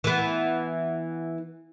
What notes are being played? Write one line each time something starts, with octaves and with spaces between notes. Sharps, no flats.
E3 B3